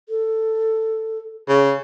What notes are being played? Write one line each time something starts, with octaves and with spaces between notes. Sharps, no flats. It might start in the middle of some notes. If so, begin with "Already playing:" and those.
A4
C#3